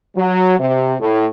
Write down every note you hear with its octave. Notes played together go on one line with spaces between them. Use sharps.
F#3
C3
A2